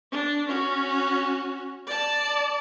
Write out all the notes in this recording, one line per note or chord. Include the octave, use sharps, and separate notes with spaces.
D4
C#4 F#4
D5 A5